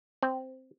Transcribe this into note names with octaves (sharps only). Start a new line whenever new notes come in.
C4